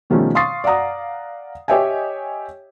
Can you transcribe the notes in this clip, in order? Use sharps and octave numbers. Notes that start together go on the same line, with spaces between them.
B2 D#3 F3 G3 A3 C#4
F5 C6 C#6 D#6 A6 C7
D5 F5 F#5 A#5 D#6
G4 C#5 D#5 E5 G5 G#5